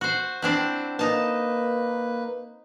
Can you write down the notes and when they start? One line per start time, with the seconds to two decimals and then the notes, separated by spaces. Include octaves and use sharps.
0.01 F#4 C5
0.42 C4 D4 E4 G5
0.99 A#3 D#4 B4 A5